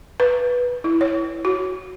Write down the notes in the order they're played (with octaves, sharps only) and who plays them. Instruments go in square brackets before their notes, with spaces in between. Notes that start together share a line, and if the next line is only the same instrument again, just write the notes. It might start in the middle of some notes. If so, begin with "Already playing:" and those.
[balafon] B4
E4
C#5
F#4